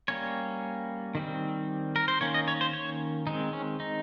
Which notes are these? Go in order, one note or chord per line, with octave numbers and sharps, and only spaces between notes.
G3 A#3 C#4 C#5
D#3 G3 C4
A#4
C5
D#3 A#3 C#4 C#5
D#5
C#5
C5
C#5
D#3 G#3 C4 D#4
C#4
D#4